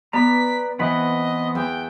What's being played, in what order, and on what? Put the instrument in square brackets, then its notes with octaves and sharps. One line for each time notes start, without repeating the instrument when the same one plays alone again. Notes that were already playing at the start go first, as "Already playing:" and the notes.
[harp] B3 [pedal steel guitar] B4 D5 A#5 [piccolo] B6
[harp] E3 [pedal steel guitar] B3 C4 B5 [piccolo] D#5
[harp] E2 [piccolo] G5